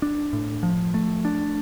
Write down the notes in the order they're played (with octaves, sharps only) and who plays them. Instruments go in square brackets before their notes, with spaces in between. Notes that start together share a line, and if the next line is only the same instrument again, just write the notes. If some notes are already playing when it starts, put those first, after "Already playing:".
[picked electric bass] D4
A2
F3
A3
D4